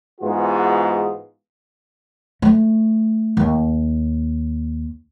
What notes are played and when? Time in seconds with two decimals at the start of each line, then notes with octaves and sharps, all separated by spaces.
0.21 G#2 E3 B3 F4 F#4 G#4
2.42 A3
3.37 D#2